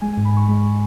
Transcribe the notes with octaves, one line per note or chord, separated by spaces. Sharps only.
G#3 G#5
G#2 G#5
B5
G#2 C#6
G#3 B5